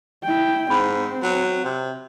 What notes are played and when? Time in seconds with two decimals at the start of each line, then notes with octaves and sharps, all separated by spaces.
0.23 E4 G5
0.70 G#2 C4 B5
1.23 F#3
1.64 C3